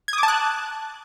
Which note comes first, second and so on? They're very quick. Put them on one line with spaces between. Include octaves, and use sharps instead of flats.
G#6 D#6 D6 A5 F#6